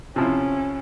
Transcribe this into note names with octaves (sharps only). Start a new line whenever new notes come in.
C3 F3 C#4 E4